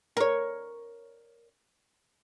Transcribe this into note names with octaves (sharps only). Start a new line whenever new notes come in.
A#4 C#5